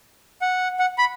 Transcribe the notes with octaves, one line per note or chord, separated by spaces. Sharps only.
F#5
F#5
B5